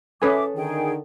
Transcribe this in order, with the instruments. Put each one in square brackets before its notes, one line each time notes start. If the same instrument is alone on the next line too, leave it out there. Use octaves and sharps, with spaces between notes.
[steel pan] C#4 B4 G#5 [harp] A4 D#6 [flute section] E5 D6
[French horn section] D3 D#3 [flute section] G#4 G5